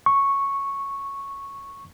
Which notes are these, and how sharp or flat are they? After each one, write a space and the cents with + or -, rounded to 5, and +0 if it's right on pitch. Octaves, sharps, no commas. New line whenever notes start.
C#6 -5